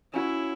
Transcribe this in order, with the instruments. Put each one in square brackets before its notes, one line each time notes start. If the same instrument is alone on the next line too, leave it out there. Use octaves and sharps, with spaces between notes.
[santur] C#4 F#4 C#5 [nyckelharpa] E4